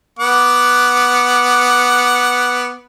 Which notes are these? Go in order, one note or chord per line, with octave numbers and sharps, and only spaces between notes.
B3 F#5 D6